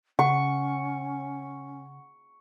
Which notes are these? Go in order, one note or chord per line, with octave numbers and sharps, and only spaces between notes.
C#3 C#4 F#5 C#6